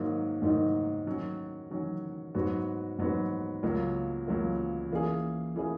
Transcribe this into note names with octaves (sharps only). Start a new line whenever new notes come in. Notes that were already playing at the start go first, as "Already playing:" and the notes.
Already playing: G#2 D#3 F#3 A#3 D#4
G#2 D#3 F#3 A#3 D#4
D#3 F#3 C#4
D#3 F#3 C#4
G#2 F#3 B3 F#4
G#2 F#3 B3 F#4
C#2 C#3 F#3 A#3
C#2 C#3 F#3 A#3
E3 A#3 C#4 G#4
E3 A#3 C#4 G#4